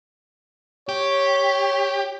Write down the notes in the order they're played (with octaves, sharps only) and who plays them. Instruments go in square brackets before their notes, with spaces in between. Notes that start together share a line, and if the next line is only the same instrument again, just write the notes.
[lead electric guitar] G4 [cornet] C#5